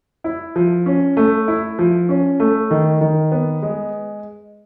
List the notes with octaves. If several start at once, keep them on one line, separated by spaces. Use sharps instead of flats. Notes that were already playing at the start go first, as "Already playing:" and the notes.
E4
F3
C#4
A3
E4
F3
C#4
A3
D#3
D#3
B3
G#3